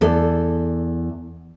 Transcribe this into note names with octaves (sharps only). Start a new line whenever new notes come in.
E2 A4 D5